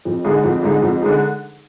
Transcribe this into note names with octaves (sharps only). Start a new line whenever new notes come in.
F2
D3 G#3 D#4 G#4
F2
D3 G#3 D#4 G#4
F2
D3 G#3 D#4 G#4